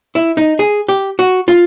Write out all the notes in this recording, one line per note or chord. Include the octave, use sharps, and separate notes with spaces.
E4
D#4
G#4
G4
F#4
F4